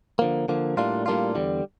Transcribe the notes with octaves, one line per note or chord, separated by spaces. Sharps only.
D3 F3 A#3
D3 F3 A#3
A2 G3 A#3 D4 F4
A2 G3 A#3 D4 F4
E2 D3 G3